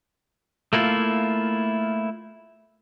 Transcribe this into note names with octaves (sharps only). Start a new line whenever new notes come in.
A3 A#3 E4 F4